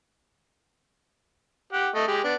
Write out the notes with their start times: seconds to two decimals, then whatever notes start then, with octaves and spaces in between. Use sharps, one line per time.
1.73 G4 F#5
1.95 A3 D#5
2.08 G#3 G4
2.24 B3 D4